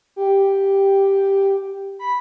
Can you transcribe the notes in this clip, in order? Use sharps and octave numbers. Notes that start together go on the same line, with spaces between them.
G4
B5